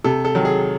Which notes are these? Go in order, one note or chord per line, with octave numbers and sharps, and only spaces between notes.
C3 A4
A4
D#3 F#3
G#4